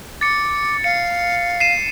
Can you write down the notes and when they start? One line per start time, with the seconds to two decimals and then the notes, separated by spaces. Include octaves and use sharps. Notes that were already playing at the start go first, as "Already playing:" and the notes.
0.21 D6 A6 C#7
0.84 F5 C#7
1.60 C7 D#7 E7